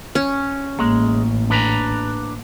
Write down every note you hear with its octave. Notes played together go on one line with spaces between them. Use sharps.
C#4
A1 G#3 A#3
D4 B4 A#5